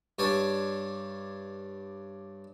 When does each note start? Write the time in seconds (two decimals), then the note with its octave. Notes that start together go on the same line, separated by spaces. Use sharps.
0.19 G2 D4 C#5 D5 G#5